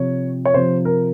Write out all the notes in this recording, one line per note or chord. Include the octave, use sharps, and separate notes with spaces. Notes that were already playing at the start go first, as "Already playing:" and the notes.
Already playing: C3 F3 C#5
C#5
C3 F3 C5
A#4